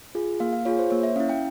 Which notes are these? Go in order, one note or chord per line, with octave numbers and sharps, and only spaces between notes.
F4 G#4
A#3 F5
F5
F4 G#4 C#5
C5
A#3 C#5
E5
C#4 E4 F5
G5